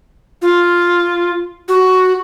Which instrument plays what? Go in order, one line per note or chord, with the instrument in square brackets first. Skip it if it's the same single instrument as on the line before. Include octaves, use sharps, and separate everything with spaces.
[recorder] F4
F#4